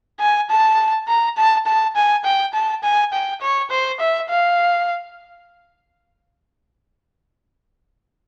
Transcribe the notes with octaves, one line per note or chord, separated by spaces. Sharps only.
G#5
A5
A#5
A5
A5
G#5
G5
A5
G#5
G5
C#5
C5
E5
F5